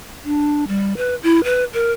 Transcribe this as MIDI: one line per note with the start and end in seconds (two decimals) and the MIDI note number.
0.24 0.67 62
0.67 0.96 55
0.97 1.15 71
1.23 1.43 64
1.44 1.64 71
1.73 1.92 70